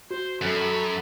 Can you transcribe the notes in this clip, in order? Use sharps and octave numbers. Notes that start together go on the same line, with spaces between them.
F#4 C5
F#2 A4 B5